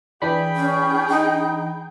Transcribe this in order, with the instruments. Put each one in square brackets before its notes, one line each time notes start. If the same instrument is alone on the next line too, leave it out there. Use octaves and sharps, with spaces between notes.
[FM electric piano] E3 D4 B5 [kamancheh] G#4 G5
[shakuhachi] C#4
D#4